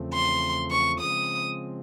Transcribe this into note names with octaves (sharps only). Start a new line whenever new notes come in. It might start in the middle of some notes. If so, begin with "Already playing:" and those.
Already playing: E2 C#3 F3 A3 C4
C6
C#6
C#3 F3 G#3 C4 D#6